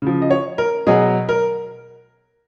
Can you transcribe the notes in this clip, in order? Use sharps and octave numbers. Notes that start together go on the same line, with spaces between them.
C#3 F3
D#5
C#5
A#4
B2 F#3 G#4
A#4